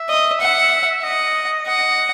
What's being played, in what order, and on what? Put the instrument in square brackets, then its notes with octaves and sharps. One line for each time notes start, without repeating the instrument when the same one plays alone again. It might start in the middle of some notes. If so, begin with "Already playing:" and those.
Already playing: [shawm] E5
[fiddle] D#5
F#5
[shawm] D#5 [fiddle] F#5
[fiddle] F#5